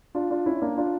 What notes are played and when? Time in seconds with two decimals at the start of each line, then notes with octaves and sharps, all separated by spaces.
0.15 D4 F4
0.31 D4 F4
0.46 C#4 E4
0.61 A#3 D4
0.77 D4 F4